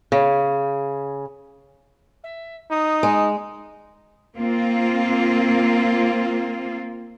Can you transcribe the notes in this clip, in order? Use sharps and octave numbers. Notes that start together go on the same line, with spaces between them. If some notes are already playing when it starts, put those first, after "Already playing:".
C#3
E5
D#4 D#6
G#3
A#3 C4 F4